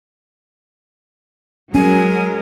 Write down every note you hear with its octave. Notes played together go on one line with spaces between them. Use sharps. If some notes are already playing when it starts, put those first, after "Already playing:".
F#3 G#3 C#4 A#4 G#5